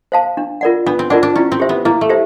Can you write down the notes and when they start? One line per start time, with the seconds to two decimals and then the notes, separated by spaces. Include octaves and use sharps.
0.12 C5 F5 A5
0.37 D4
0.61 F4 A#4 D5 F#5
0.86 B3 D4
0.99 C4
1.10 D4 F4 A#4 D5 F#5
1.23 D4
1.35 C#4 E4
1.52 C4
1.60 G4 C5 E5
1.69 B3
1.85 A#3 E4
2.01 A3
2.10 G4 C5 E5